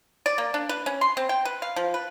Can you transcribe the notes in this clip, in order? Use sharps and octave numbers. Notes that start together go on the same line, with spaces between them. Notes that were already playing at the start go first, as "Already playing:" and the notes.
D5
A#3
D4
B4
C#4
C6
C4
G5
B4
F5
F3
B4